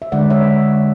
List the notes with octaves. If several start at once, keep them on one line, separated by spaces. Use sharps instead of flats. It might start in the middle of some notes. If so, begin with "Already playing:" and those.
E5
D3 G#3 D5 F#5
C#5 E5